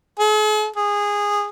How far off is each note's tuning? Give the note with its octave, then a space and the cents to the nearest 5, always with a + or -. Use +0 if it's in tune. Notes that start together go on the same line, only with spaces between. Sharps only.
G#4 +45
G#4 -15